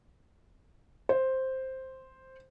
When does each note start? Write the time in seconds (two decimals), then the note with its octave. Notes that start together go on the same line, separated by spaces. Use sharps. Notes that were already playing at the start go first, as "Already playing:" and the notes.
1.09 C5